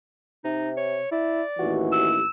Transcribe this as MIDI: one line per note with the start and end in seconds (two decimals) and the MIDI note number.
0.45 1.01 48
0.45 0.70 63
0.77 1.11 73
1.12 1.42 64
1.12 1.77 74
1.59 2.22 33
1.59 2.22 39
1.59 2.22 52
1.59 2.12 66
1.92 2.30 88